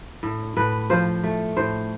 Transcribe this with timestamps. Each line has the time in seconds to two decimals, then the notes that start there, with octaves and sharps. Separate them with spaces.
0.23 A2
0.57 A2 B4
0.90 F3 C5
1.23 A3
1.57 A2 C5